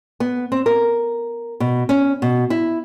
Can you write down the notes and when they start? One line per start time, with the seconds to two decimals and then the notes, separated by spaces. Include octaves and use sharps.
0.20 B3
0.52 C4
0.66 A#4
1.60 B2
1.89 C#4
2.22 B2
2.50 E4